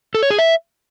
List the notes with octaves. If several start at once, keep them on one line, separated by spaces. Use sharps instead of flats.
A4
C#5
G#4
E5